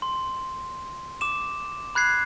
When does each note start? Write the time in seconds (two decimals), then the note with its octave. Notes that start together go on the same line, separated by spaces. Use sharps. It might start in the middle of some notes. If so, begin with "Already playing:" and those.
0.02 C6
1.21 D6 E7
1.95 B5 F#6 G#6 C7